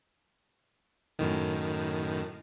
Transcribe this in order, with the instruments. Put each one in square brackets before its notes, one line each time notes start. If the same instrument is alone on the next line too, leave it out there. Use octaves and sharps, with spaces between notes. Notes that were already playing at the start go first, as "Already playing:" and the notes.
[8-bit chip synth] F#2 A2 D#3